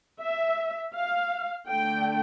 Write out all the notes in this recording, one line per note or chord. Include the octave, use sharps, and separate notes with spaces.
E5
F5
D3 A3 D4 G5